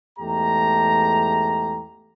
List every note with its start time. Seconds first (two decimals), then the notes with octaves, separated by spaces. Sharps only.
0.19 E2 G#2 A3 G4 A#5